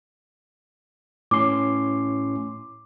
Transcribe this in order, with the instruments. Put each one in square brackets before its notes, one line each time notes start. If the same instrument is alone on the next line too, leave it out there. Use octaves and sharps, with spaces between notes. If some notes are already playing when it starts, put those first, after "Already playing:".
[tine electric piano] A2 C#4 C6 [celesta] D6